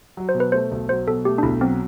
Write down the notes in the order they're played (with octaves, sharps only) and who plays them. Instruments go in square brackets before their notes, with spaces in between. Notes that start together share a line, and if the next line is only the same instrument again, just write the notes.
[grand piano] F#3
[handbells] C5
[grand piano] B2
[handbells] B4
[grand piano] A3 [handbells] C5
[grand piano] B1
[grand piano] F#3 [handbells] C5
[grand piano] B2 [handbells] A4
[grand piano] A3 [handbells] G4
[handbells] D4
[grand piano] B1 [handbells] E4
[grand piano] F#3 [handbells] C4